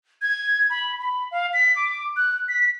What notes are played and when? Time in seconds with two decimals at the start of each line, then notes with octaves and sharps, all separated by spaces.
0.22 G#6
0.70 B5
1.00 B5
1.31 F5
1.53 B6
1.76 D6
2.17 F#6
2.49 B6